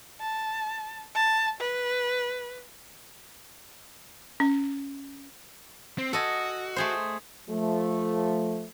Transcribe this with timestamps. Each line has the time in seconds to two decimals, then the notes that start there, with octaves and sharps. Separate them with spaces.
0.20 A5
1.15 A5
1.60 B4
4.40 C#4
5.98 C4
6.13 F#4 A4 D#5 G#5
6.76 A3 G#4 C5
7.49 F3 A3